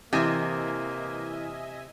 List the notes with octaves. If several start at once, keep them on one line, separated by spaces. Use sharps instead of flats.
C3 E3 A#3 D#5 E5 G#5